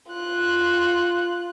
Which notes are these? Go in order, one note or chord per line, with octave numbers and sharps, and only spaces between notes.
F4 F#6